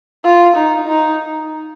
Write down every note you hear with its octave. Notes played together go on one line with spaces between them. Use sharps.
F4
D#4
D#4